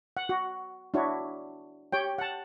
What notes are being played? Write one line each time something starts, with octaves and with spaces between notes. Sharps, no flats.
F#5
F#4
D4 E4 F#4 C#5
G4 C#5 G5
F#5 A5